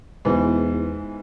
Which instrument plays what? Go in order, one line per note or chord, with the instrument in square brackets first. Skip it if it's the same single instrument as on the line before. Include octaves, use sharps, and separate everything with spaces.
[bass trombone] E2 [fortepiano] G#2 B2 E3